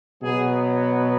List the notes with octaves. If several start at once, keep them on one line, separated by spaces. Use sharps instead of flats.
B2 F#3 B3 G#4